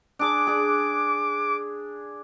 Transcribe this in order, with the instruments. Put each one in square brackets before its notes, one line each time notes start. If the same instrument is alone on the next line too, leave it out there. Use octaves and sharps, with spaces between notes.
[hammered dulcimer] D4 G#4 D5 [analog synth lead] D6
[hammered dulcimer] D4 G#4